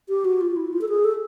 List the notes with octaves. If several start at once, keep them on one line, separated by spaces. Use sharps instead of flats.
G4
F#4
F4
E4
F4
A4
G#4
A4